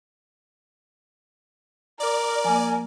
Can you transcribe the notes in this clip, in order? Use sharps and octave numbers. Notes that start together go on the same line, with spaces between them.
A#4 D5
F3 A#3 G#5